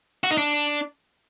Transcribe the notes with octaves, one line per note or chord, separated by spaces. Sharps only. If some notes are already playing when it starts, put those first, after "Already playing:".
F#4
D#4
D4